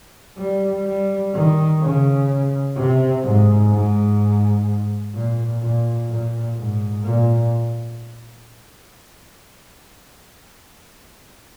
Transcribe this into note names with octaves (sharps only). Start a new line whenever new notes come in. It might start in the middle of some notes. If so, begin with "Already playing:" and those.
G3
G3
D#3
C#3
C3
G#2
G#2
A#2
A#2
A#2
G#2
A#2